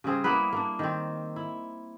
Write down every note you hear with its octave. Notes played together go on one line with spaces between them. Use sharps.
C#3 G3 C4 G#4
A#3 B3 E4 B4
A#3 D4
D#3 C4
E4